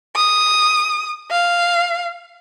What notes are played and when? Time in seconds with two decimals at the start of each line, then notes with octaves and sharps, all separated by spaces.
0.15 D#6
1.31 F5